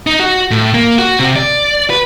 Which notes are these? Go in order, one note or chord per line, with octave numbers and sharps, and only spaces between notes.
D#4
F#4
A2
A#3
F#4
C3
D5
B4